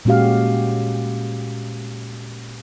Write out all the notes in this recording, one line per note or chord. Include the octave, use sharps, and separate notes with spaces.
A#2 G#3 C#4 F#4 G4 F5